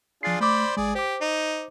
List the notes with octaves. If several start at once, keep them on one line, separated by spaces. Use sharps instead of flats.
F3 D4 F4 G#4 A6 C7
A3 C5 D5 B5 D6
G#1 G#3 G#4 D5
G4 C5 D6
D#4